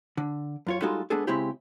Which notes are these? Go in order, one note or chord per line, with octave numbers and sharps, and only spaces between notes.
D3
F#2 F4 C#5
G3 G#3 D#4 F4 F#4 A4
G#3 B3 D4 G#4 A4
C#3 G#3 C4 E4 G4